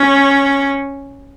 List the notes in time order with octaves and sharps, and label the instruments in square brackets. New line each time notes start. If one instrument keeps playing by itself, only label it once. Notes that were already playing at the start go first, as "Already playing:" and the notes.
Already playing: [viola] C#4